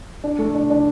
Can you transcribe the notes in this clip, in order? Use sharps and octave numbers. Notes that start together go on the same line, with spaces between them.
D4
A3
D4
D4